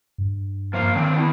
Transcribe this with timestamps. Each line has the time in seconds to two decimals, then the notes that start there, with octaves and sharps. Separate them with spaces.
0.18 G2
0.73 F3 A#3 F5
0.96 D#3 C4 D4 G5
1.16 B3 E4